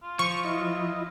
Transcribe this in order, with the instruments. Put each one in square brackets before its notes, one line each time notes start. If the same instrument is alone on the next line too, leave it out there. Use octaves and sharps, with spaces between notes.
[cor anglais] F4
[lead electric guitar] F3 [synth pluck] C#6
[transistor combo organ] E4 D#5